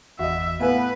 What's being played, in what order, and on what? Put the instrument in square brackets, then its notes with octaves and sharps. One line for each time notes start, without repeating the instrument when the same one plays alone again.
[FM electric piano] G1 E2 [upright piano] F#4 D#5 [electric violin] E5
[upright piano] A2 G#5 [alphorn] B3 [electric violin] B4 [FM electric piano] F5